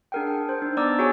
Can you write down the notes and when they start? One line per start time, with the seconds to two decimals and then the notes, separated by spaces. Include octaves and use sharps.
0.12 D4 G#4 A#4 F#5 G5
0.27 G5
0.49 C5
0.62 D4 D#4
0.77 B3 D5 A#5 D6 E6
0.99 F#4 G#4 C#5 G#5